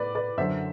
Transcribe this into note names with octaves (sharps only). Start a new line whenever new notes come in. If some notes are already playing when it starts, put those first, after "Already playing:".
Already playing: A2 B4 D5
B4 D5
F#2 D3 F#3 C5 E5